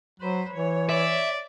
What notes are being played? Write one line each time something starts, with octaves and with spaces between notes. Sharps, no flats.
F#3 B4 C5
E3 C#5
D5 E5